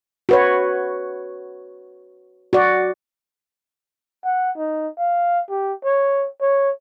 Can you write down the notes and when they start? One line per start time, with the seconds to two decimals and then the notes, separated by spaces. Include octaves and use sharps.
0.29 F#4 B4 C#5
2.53 F#4 D5
4.25 F#5
4.57 D#4
4.99 F5
5.50 G4
5.84 C#5
6.41 C#5